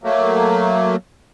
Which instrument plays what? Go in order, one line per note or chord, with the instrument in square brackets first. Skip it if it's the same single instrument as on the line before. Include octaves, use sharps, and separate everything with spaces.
[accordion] F#3 A3 A#3